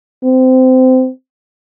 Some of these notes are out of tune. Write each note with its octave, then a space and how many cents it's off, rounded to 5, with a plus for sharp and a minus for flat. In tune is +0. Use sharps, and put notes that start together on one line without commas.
C4 -20